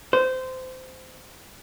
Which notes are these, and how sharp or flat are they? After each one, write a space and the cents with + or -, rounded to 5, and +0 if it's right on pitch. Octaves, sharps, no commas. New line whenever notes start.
C5 -20